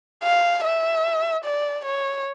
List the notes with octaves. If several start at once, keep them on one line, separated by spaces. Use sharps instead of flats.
F5
E5
D5
C#5